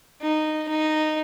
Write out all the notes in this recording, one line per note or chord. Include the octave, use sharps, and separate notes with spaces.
D#4
D#4